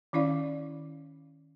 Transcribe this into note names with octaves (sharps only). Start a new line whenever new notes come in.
D#3 C#4 E4 D5 F5